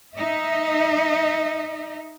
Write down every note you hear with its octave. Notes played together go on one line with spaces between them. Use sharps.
D#4 D#5 E5